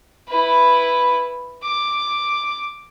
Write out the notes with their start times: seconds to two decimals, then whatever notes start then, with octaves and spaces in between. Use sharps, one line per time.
0.28 E4 B4
1.63 D6